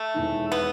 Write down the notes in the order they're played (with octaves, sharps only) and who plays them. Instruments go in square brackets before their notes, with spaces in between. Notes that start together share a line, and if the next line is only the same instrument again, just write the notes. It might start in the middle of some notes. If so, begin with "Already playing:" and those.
Already playing: [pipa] A3
[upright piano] E1 E2 D#3
[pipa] B3